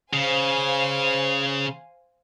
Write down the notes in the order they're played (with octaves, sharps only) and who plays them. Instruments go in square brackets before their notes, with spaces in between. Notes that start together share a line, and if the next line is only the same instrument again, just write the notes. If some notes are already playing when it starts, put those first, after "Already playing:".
[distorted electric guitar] C#3 [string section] C5 F5 G#5